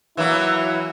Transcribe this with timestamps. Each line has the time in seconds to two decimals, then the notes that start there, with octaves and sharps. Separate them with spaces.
0.17 E3 F#3 A#3 E4